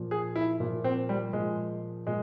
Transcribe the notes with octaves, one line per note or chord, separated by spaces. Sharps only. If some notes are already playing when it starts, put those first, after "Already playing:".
Already playing: A#2 F3
G#4
E4
A#2 F3
C4
G3
A#2 F3 G#3
A#2 G#3